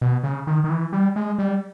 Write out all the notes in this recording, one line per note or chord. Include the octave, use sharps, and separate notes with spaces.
B2
C#3
D#3
D#3
E3
G3
G#3
G3